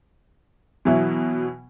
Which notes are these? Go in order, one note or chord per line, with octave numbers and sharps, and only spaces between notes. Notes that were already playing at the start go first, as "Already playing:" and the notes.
B2 E3 F#3 E4